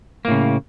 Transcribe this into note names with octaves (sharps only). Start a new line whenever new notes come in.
A2 C#3 A#3